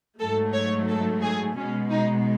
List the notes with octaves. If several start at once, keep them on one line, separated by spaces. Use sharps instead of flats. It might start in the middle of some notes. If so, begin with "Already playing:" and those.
G#2 F#3 A3 A4
C#5
A4
G#4
B2 G#3 C#4
D#4